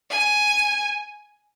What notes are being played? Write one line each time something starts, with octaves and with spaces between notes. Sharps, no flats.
G#5